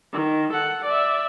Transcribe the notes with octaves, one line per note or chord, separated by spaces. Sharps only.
D#3
A4 F#5
D5 E5